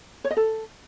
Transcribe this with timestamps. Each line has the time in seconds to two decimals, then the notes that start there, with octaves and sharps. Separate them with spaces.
0.24 C#5
0.31 D#5
0.37 A4